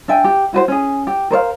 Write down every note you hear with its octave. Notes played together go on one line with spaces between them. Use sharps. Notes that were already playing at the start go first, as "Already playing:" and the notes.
D4 E5 G5 G#5
G4
E4 F#4 B4 C5
C#4 G#4
G4
A#4 C5 C#5 F5